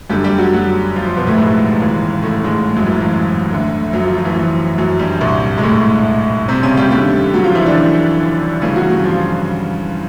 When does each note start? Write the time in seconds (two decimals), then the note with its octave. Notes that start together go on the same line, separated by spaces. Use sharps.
0.10 F#2 D3 G3 G4
0.24 G3 G4
0.39 F#3 F#4
0.53 F#3 F#4
0.95 F3 F4
1.06 F3 F4
1.17 B2 B3
1.27 A2 A3
1.38 G#2 G#3
1.80 D#2 C#3 E3
2.23 A2 A3
2.44 G#2 G#3
2.76 F#2 F#3
2.87 E3
2.98 F3
3.50 D2 D3
3.93 F#2 F#3
4.04 F3
4.14 F3
4.25 E3
4.36 F3
4.78 F#2 F#3
4.99 G2 G3
5.21 C2 A#2
5.58 G#3
5.63 A2 A3
6.48 C3 C4
6.63 C#3 C#4
6.77 G3 G4
6.91 D#2 D3 G3 G4
7.34 F#3 F#4
7.44 F3 F4
7.55 E3 E4
7.66 D3 D4
8.61 G2 C#3 E3 C#4
8.76 F#3 F#4
8.90 F#3 F#4
9.04 F3 F4